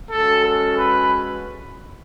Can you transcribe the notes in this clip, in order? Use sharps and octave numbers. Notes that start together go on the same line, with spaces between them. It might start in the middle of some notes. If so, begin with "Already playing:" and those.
G#3 C#4 F#4 A4
A4
B4